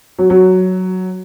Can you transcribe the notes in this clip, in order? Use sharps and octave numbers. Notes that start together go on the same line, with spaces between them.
F#3
F#3